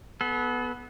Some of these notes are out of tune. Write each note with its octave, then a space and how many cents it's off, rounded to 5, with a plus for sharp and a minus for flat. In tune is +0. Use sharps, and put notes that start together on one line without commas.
B3 -5 A4 -40